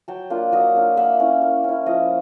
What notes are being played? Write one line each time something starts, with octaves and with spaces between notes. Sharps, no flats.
F#3 G5 A5
A#3 D4 F4
F#3 D#5 F5
A#3 D4 F4
A#3 E5 F#5
C#4 E4
A#3
C#4 E4
F3 D#5 F5